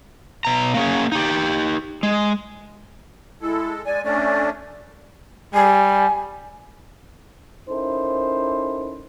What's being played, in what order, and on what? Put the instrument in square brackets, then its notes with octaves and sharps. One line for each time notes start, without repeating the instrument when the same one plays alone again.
[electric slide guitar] B2 A#5
A#3 C#4 G#4
D#4 G4
G#3
[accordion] G#3 A4 [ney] E4
[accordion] G#3 G#5 [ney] D5
[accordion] A3 C#4 D4 [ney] D5
[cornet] G3 [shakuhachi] G#5
[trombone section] C#4 D#4 E4 A4 A#4 C5